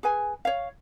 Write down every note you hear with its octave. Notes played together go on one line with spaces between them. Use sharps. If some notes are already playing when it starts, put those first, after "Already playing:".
G#4 B4 G#5
C#5 F5